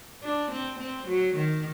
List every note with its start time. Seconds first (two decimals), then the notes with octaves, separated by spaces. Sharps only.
0.23 D4
0.52 C4
0.80 C4
1.08 F#3
1.36 D#3